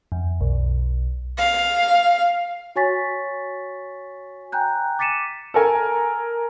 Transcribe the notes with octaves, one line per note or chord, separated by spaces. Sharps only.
F2
B1
F5
F#4 C#5 G#5 C#6 A6 B6
G5 G#5 A#5 F#6 G6
D6 A6 B6 C#7 D#7 E7
A4 A#4 G#5